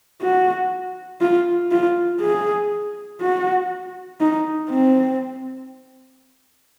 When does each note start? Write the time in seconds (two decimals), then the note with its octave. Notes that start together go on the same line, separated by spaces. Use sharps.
0.22 F#4
1.21 F4
1.71 F4
2.21 G#4
3.21 F#4
4.20 D#4
4.70 C4